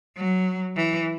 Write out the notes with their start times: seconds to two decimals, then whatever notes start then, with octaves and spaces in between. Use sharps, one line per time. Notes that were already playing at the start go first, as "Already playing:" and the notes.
0.17 F#3
0.76 E3